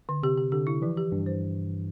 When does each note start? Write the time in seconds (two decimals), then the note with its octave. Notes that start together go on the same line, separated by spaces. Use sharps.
0.09 D3
0.23 C3 G4
0.37 G4
0.52 D3 G4
0.67 E4
0.82 E3 F3
0.97 G4
1.12 G2 F3
1.26 C5